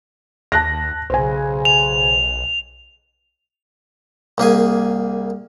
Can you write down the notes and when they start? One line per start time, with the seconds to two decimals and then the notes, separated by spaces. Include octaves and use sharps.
0.52 D#2 A5 F#6 A#6
1.10 B1 C#3 C5 G#5
1.65 F7
4.38 C2 A#3 G#4 G#5